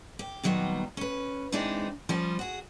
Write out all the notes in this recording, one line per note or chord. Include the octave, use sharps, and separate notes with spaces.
G4
A#2 D#3 F#3 G3 B3
C#4 B4
E3 G#3 C4 D4 D#4
F3 G3 C#4
F#4 G#4